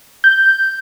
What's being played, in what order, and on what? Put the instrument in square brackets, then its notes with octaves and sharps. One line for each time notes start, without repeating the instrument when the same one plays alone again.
[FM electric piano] G6